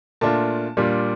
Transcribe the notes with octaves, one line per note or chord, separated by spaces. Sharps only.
A#2 A3 D4 F4 A5
A#2 G3 D4 F4